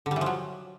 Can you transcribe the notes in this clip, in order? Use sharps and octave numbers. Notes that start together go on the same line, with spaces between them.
D3
G3
E3
F3
F#3